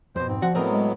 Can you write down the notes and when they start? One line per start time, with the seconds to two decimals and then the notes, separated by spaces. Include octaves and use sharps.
0.16 F2 B2 C5
0.28 G#2 C4
0.42 D2 F3 F#4 F#5
0.55 A2 F#3 B3 C4 A#4 D#5
0.72 G#3